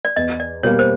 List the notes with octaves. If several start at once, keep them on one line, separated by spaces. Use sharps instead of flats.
D5
E2 D#5
D5
B2 G3 A#3 C#5
C5